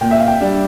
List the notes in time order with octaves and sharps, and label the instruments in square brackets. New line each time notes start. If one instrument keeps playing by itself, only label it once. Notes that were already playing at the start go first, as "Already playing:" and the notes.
[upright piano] A#2 [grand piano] G5
[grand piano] E5
F5
G5
[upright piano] G3 D4